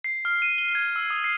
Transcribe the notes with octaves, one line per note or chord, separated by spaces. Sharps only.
C7
F6
D#7
G7
G#6
E6
D#6
C7